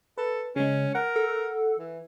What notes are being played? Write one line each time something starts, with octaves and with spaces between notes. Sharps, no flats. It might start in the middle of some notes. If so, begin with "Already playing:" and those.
A4 B4
C#3 G#3 C#4
A#4 F#5
A4
E3